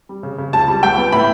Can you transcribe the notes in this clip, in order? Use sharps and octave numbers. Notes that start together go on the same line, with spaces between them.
G3
C#3
C#3
C#2 A5
G3
C#2 G5
B3
A2 B5